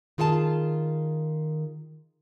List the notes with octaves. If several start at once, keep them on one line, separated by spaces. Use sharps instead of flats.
D#3 F4 G#4 F#5 A5